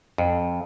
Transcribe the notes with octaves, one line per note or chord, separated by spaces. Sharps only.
F2